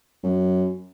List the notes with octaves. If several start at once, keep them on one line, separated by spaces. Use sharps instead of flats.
F#2